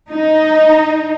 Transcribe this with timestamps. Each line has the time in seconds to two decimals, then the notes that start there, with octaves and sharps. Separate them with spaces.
0.11 D#4